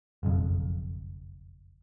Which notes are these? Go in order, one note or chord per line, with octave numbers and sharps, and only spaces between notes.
F#1 B1 F2